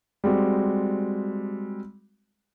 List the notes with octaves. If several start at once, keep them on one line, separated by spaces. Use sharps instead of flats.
G3 G#3 C4 F#4